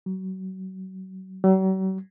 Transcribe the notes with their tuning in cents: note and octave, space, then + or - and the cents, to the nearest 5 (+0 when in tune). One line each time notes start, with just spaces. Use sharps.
F#3 +30
F#3 +45